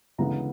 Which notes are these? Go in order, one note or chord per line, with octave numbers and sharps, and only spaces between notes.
D2 C#3 E3 G#3 B3 A#5